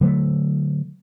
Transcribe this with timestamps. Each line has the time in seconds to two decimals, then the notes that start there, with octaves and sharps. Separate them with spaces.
0.01 D3 F#3 G#3 A3